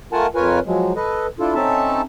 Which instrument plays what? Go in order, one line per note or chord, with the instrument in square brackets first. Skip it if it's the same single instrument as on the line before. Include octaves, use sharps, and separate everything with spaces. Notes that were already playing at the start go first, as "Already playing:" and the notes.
[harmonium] A3 F4 A#4 F#5 G#5 A5
F2 F4 A#4 B4 C#5 G#5
F3 F#3 G#3
A4 B4 D#5
D4 E4 F4 A4
C4 C#4 D#4 A4 E5 A5